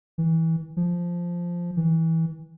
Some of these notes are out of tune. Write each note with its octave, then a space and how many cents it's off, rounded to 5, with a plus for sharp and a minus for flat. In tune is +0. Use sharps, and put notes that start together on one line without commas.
E3 -20
F3 -5
E3 -20